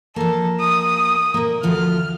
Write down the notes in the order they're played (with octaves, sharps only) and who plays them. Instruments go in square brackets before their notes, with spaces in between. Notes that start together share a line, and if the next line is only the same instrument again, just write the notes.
[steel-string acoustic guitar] F3 A#3 [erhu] A4
[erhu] D#6
[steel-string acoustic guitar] A#2 A#3
[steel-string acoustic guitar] D2 F3 F4 [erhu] F6